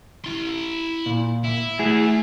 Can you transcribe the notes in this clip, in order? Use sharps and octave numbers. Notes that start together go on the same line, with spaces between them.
E4 C6
A#2
E4
A3 E4 G#4